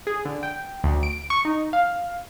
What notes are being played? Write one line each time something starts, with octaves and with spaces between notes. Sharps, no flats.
G#4
D3
G5
D2
D7
C#6
D#4
F5